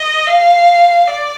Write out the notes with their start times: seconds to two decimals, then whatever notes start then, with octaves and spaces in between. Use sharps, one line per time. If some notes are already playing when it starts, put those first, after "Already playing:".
Already playing: D#5
0.27 F5
1.08 D5